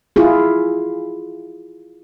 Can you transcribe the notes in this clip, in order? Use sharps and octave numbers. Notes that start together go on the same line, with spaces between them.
E4 F4 G#4